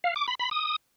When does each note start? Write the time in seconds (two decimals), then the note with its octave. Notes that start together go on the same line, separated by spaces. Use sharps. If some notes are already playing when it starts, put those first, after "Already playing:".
0.04 F5
0.16 D6
0.28 B5
0.39 B5
0.51 D#6